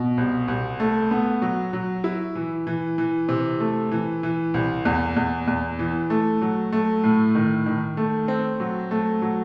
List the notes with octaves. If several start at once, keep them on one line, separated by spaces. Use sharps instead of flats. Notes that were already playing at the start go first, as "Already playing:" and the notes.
Already playing: B2
C2
C2
A3
B3
F#3
F#3
E4
E3
E3
E3
C3
A3
E3
E3
C2
E2
E2
E2
E3
A3
F#3
A3
A2
D#3
D#3
A3
C4
F#3
A3
F#3